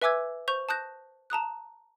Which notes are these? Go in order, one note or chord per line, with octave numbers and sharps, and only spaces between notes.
B4 E5 G#5 D6 E6 G#6
C5 C#6 G6 F7
A5 D#6 F#6 G6 A#6
A5 A#5 D#6 F#6